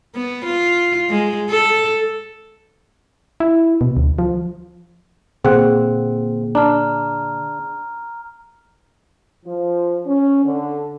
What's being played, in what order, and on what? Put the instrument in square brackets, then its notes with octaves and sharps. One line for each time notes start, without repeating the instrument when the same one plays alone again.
[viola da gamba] B3
F4
G#3
A4
[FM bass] E4
B2
D2
F3
[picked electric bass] A#2 D3 A#3 [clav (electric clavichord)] C4 F#5 [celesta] G#4
[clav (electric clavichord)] D4 [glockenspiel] A#5 F6
[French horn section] F3
C#4
D3